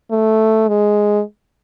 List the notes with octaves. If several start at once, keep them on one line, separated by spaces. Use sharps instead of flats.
A3
G#3